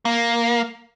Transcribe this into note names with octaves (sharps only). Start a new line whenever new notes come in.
A#3